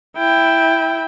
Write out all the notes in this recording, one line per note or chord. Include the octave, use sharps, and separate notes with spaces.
E4 G5